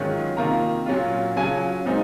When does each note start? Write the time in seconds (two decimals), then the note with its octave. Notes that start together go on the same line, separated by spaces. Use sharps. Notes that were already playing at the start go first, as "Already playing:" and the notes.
Already playing: G#2 D#3 F#3 C#4 F4
0.37 C3 D#3 A#3 F4 A#5
0.86 A#2 F#3 C#4 F4
1.36 C#3 F#3 C#4 F4 G#5
1.86 A#2 G#3 C4 D#4